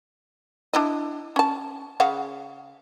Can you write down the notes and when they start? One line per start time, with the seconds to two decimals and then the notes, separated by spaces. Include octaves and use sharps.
0.73 D4 E4 D#5
1.36 C#4 A5
2.00 C#3 F5 F#5